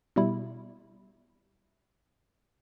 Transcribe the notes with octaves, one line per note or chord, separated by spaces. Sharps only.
B2 G3 E4